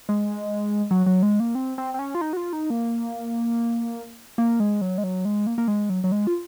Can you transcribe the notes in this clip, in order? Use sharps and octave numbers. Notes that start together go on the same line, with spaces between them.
G#3
F#3
F#3
G#3
A#3
C4
C4
C4
C#4
F4
D#4
F#4
F4
D#4
A#3
A#3
G#3
F#3
G#3
F#3
G#3
A#3
A#3
G#3
F#3
F#3
G#3
F4